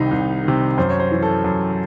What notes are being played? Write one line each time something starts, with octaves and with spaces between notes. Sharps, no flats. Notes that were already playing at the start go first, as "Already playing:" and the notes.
Already playing: C2 C3 D#3 D#4
C2
C3 D#3
F#2 C5
C#5
C5
E3
A4
F#2